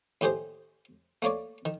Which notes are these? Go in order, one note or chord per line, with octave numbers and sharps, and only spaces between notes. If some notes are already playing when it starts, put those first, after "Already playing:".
D#2 A2 G4 G#4 C5
A3 A#3 C#5 D5
D#3